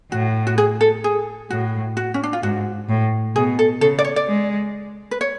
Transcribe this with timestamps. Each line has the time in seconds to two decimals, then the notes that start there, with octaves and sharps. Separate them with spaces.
0.12 A2 F#4
0.47 F#4
0.58 G#4
0.81 A4
1.04 G#4
1.50 A2 F#4
1.97 F#4
2.14 C#4
2.23 D4
2.33 F4
2.43 G#2 F#4
2.89 A2
3.35 B2 G#4
3.59 A4
3.81 C#3 A4
3.99 D5
4.05 C#5
4.16 D5
4.28 G#3
5.11 B4
5.21 C#5